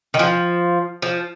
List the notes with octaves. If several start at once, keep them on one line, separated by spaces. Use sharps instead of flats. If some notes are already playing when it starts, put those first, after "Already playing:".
D#3
F3
F3